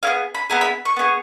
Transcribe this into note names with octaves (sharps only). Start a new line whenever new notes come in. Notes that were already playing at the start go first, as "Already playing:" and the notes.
B3 E4 G#4 F5
B5
B3 E4 G#4 A#5
B5
C#6
B3 E4 G#4